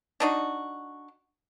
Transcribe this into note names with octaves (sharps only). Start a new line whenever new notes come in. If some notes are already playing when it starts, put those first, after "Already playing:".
D4 D#4 F#4